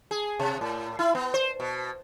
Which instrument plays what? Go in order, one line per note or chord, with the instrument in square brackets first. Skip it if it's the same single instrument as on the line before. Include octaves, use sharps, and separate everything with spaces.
[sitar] G#4
C3
A2
E4
B3
C5
B2